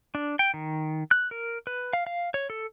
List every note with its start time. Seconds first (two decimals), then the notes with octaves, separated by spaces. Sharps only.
0.15 D4
0.39 G5
0.54 D#3
1.11 F#6
1.31 A#4
1.67 B4
1.93 F5
2.07 F5
2.34 C#5
2.50 A4